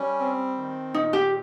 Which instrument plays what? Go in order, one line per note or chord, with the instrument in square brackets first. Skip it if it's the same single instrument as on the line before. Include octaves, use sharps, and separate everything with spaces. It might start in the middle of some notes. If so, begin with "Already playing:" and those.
Already playing: [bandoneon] G3 C#4
C4
D#3
[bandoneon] A#2 [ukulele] D#4
[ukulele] G4